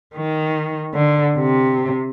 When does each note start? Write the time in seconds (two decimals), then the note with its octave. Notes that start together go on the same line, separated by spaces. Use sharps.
0.14 D#3
0.94 D3
1.38 C3